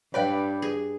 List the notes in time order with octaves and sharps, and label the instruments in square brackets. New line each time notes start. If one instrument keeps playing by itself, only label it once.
[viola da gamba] G2 [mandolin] B4 D5 G5 [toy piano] C#5 F5
[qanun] G#4